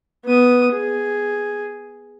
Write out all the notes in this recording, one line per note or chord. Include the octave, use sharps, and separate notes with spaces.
B3 D#6
G#4